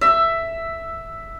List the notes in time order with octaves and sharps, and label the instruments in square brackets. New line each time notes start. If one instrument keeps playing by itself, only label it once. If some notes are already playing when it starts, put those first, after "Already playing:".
[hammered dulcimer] E5